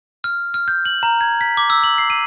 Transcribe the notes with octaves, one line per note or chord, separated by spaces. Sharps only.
F6
F6
G6
F#7
A#5
G#6
B6
D6
E6
F#7
C7
D#7